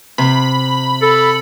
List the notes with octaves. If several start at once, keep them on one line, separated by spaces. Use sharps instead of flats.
C3 B5
A4